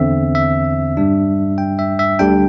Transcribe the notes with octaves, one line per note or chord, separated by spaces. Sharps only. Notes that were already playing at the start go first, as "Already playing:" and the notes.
Already playing: E2 D3 C4 E5
E5
G2 G3 D4
G5
E5
E5
D2 D3 G3 D4 G5